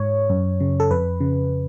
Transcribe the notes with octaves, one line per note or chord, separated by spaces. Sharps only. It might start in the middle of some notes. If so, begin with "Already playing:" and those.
Already playing: G#2 C#5
F#2
C#3
A4
F2 B4
C#3